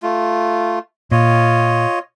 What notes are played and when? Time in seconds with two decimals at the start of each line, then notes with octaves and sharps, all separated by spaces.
0.03 A3 F4
1.11 A#2 F4 C#5 D#5